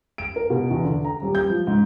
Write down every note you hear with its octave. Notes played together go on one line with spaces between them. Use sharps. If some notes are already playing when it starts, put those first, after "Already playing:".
D7
A#4
B2
E2
D3
A#5
D#1
G6
F3
G#2